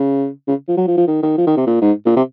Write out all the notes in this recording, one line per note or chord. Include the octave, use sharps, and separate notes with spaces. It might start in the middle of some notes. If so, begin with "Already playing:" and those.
Already playing: C#3
C#3
F3
F#3
F3
F3
D#3
D#3
F3
D#3
C3
A#2
G#2
A#2
C3